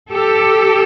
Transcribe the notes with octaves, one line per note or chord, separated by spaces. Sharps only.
G4 A4